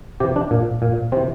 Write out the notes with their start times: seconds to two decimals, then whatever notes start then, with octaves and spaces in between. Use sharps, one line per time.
0.20 C3 E3 G4
0.36 D4
0.51 A#2
0.82 A#2
1.12 C3 E3 C4